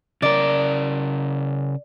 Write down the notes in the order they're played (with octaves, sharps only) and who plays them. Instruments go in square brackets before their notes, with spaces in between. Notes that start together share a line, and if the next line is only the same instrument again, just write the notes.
[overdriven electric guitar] C#3 A#4 [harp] D5